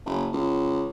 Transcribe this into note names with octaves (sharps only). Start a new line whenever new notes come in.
F#1
C#2